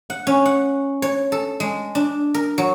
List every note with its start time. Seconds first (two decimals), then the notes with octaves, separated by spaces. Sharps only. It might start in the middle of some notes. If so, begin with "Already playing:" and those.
0.10 F#5
0.27 C#4
0.45 F#5
1.02 C#5
1.32 A4
1.60 G#3
1.95 D4
2.34 A#4
2.58 F#3